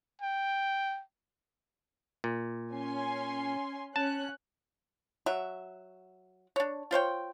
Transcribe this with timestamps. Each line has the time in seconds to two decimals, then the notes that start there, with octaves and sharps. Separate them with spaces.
0.21 G5
2.24 A#2
2.72 C#4 G#5 C6
3.96 C#4 A5 F#6
5.26 F#3 F#4 E5
6.56 D4 C#5
6.91 F4 C5 C#5 G5